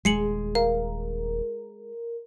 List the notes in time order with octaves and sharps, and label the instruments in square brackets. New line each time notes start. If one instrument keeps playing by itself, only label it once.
[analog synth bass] D#1 [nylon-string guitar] G#3 [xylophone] C7 C#7 F#7
[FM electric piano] A#4 [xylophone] F5